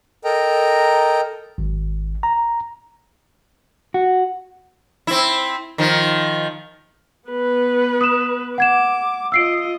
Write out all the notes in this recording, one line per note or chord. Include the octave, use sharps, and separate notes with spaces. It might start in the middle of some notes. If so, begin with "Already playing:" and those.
A4 A#4 D#5 G5 A#5
G#1
A#5
F#4
C4 E4
D#3 F3
B3 B4
D#6 E7
F#5 D6 G#6 E7
F4 D#5 E6 C7 D7